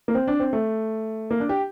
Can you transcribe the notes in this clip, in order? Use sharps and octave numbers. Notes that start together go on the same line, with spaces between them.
A#3
C4
D4
C4
A3
A#3
D4
G4